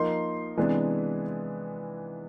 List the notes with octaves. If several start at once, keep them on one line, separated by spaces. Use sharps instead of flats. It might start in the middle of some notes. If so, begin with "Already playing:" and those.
Already playing: F3 A#3 D#4 C6
C3 E3 G#3 B3 D4